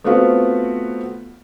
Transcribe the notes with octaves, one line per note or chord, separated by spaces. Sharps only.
A3 B3 C4 F4 F#4 B4